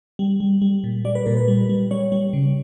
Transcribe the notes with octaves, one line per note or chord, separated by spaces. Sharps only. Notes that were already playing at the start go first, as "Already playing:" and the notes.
G3
G3
G3
A#2
G3 D5
B4
A#2 A#4
B4
G3
G3
G3 C#5
G3
C#3